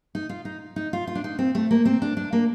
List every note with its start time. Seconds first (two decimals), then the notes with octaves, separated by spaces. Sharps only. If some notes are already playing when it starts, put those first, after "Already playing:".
0.15 D#4
0.29 F4
0.45 D#4
0.76 D#4
0.93 F4
1.07 F4
1.15 D4
1.24 D#4
1.39 C4
1.55 A3
1.71 A#3
1.85 C4
2.02 D4
2.17 D4
2.33 A#3